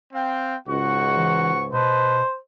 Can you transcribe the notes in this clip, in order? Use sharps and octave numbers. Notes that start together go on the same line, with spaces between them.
C4 F5 G5
C#2 G#2 F#4 F#5 C#6
E3
B2 B4 C5 D#5 A5